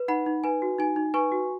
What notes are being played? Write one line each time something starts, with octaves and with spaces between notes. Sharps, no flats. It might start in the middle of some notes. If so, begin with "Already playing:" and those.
Already playing: B4
D#4 F#5 B5
D#4
B4 G#5
F#4
D#4 G#5
D#4
B4 G#5 C#6
F#4